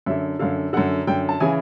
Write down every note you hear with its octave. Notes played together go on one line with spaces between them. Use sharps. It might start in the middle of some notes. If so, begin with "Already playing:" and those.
F#2 D3 E5
F#2 D3 F5
F#2 D3 F#5
F#2 D3 G5
A5
C#3 E3 G#5